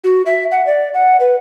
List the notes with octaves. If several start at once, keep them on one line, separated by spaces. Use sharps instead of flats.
F#4
E5
F#5
D5
F#5
B4